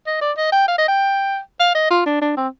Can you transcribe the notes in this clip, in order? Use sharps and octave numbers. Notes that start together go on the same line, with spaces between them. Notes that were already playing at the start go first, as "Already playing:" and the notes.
D#5
D5
D#5
G5
F5
D#5
G5
F5
D#5
F4
D4
D4
C4